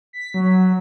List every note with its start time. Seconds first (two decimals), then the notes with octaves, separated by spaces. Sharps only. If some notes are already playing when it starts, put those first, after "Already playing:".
0.13 B6
0.34 F#3